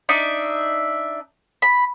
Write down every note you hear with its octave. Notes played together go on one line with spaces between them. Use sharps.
D4 D#4 E5
B5